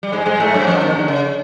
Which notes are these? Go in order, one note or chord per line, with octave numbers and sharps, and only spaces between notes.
G3
G#2 G#3
G#2 G#3
A2 A3
F#2 F#3
F2 F3
D#2 D#3
D3
C#3